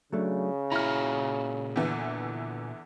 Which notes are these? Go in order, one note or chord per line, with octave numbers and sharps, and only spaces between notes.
C#3 F#3 A3 D4
A#2 E4 F#4 A#5 B5 F6
E2 D3 E3